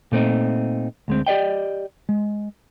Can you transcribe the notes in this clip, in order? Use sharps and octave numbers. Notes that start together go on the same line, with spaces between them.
A#2 A3 C4 D#4
D2 G#3 C4
G4 D5 D#5 G5
G#3